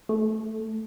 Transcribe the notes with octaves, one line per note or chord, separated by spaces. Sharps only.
A3